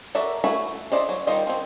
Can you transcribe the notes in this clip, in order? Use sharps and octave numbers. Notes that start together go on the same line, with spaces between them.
F#4 A4 A#4 D5 E5
A3 E4 F#4 B5
E4 C5 D5 D#5
F#3
D#3 G3 F4 C5 D#5
F3 C4